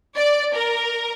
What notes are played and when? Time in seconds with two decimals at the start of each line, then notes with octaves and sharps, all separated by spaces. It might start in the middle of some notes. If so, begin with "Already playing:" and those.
0.17 D5
0.55 A#4